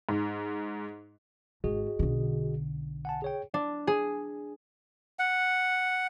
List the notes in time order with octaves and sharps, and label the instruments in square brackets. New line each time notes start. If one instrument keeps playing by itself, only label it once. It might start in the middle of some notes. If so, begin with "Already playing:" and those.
[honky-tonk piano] G#2
[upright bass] G#1 [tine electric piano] F#4 G#4 D#5
[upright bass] B1 D3
[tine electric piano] F#5 G#5 A5
G#4 C#5 G5
[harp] D4
G#4
[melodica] F#5